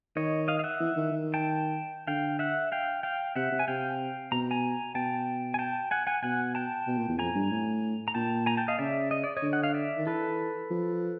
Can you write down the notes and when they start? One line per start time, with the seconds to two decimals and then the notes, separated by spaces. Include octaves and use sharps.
0.16 D#3 C#5 D#5
0.48 D#5 F5
0.59 F5
0.64 E5 F#5
0.80 E3
0.96 D#3
1.12 D#3
1.34 G5 A5
2.07 D3 F5 G5
2.39 E5 F#5
2.72 F5 G5
3.03 F5 G5
3.35 C3 E5 F#5
3.51 C3
3.59 G#5
3.68 C3 F5 G5
4.32 B2 A#5
4.51 G#5 A#5
4.95 B2 G5 A5
5.54 G#5
5.59 G5 A5
5.91 F#5 G#5
6.07 F#5 G#5
6.23 B2 F#5 G#5
6.55 G5 A5
6.87 B2
6.97 A#2
7.09 E2
7.18 F2 G#5 A#5
7.35 G2
7.51 A2
8.08 A#5
8.14 A#2 G5 A5
8.46 G#5 A#5
8.57 G5 A5
8.68 D#5 F5
8.79 C#3 D5 E5
9.11 D#5
9.24 D5
9.37 C#5 D#5
9.42 D3
9.53 F#5
9.63 F5
9.74 D5 E5
9.97 D#3
10.07 E3 A4 B4
10.70 F3